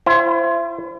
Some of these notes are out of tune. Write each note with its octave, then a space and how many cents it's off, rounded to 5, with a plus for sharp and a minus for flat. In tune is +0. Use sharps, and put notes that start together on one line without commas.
E4 +40 C5 +0